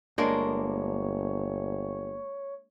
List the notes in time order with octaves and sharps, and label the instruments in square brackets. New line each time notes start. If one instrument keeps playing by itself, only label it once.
[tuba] G1 [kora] G#3 A#3 D4 [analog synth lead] C#5